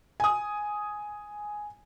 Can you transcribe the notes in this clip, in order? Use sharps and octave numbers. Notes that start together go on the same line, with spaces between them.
G#5 D#6